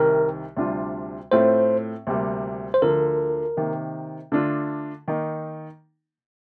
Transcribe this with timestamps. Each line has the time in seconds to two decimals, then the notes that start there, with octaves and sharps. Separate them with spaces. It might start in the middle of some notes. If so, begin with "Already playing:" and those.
Already playing: C2 C3 D#3 A#4
0.57 D2 C3 G3 D4 F4
1.32 A2 A3 C4 F4 C5
2.07 D2 C3 G3 A#3
2.74 C5
2.82 D2 D3 F3 A#4
3.57 C3 D#3 A#3
4.32 D3 A3 D4 F4
5.08 D#3 A#3 D#4